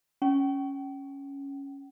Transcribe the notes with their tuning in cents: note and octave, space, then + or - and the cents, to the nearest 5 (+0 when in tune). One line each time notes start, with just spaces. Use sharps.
C#4 +0 G5 -40